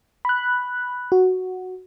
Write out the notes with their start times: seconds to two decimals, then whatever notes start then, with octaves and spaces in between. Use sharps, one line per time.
0.25 B5 F#6
1.12 F#4